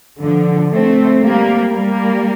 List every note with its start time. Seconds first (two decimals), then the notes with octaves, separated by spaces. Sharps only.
0.22 D3 F3
0.72 A3 C4
1.22 G3 A#3
1.72 G3 A#3